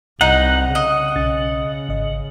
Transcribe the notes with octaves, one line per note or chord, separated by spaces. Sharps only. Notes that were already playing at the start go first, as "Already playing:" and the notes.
C2 D#4 F#5
C#3 D#5
B1 C#4 A6
G#1 D#5